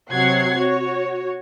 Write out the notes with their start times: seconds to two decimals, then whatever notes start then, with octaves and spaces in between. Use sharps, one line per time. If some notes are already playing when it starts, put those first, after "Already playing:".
0.10 C3 F#3 C#5 F#5 G#6 C7
0.56 F#4 C#5